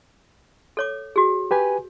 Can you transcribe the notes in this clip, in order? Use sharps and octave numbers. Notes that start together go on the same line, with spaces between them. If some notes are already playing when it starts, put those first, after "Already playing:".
A4 C#5 D6
F#4 G#4
G4 B4 G#5